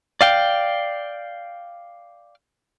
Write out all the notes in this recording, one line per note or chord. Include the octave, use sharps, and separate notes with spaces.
D5 F5 G5